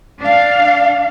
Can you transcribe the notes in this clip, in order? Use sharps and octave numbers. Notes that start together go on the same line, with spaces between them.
D4 F5